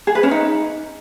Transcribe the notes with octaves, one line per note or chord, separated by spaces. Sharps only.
G#4
B4
C#4
D#4